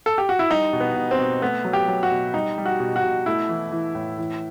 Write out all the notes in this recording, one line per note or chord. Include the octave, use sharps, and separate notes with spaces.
A4
G4
F#4
E4
G3 D#4
B2
B3
B2
C4
B2
A3 B3
F#3
G4
F#3
F#4
B2
G3 D#4
G3
F#4
B2
F#4
B2
A3 E4
E3
E3
A2
E3